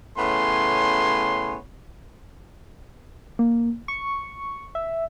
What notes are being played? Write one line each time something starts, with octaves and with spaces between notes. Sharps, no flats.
A2 C#3 B3 C#5 G#5 C6
A#3
C#6
E5